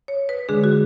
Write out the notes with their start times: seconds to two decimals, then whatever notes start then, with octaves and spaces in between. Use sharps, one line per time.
0.08 C#5
0.29 B4
0.49 D3 G#3 D4 G#4
0.64 F#4